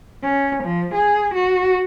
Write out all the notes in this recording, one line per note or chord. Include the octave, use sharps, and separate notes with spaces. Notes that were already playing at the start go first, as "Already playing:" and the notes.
C#4
F3
G#4
F#4